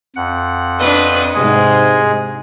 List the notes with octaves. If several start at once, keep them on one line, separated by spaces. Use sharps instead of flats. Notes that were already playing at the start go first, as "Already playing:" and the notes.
F2 F#5
D4 B4 D#5
G#2 C3 G#3 G#4